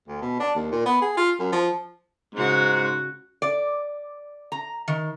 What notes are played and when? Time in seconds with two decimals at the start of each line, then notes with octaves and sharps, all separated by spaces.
0.08 D2
0.22 B2
0.40 D4
0.55 D#2
0.72 A#2
0.86 B3
1.02 G#4
1.17 F4
1.39 F#2
1.52 F3
2.35 G#2 C#3 F#4
3.42 D5
4.52 A#5
4.88 D#3